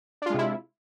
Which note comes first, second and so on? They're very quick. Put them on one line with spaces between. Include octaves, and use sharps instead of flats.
D4 F4 G#3 C3 E4